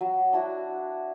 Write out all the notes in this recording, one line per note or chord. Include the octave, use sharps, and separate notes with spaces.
F#3
D4 E4 F#4